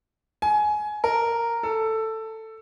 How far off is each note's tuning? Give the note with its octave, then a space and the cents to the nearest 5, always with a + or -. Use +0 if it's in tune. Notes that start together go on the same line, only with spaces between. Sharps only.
G#5 +20
A#4 -5
A4 +10